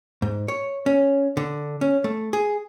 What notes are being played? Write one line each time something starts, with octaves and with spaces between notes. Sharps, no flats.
G#2
C#5
C#4
D3
C#4
A3
G#4